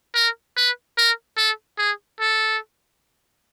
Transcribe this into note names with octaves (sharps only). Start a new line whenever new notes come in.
A#4
B4
A#4
A4
G#4
A4